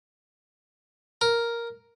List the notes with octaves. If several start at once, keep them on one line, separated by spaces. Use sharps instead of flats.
A#4